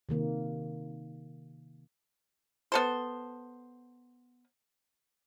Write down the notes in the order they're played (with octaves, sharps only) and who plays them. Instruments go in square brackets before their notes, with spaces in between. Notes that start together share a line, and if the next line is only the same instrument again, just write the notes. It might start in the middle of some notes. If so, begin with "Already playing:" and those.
[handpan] C3 D#3 A#3
[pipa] B3 A4 C5